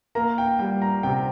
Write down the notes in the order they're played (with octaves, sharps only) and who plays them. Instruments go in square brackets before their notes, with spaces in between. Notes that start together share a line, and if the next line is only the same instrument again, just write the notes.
[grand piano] A#3 A#5
G5
G3 G5
A#5
C3 G5